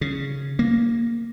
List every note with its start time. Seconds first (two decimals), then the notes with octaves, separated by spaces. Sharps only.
0.01 C#3
0.59 A#3